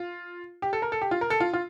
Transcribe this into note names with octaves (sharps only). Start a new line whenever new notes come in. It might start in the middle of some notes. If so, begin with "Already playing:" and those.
Already playing: F4
G4
A4
A#4
A4
G4
F4
A#4
A4
F4
F4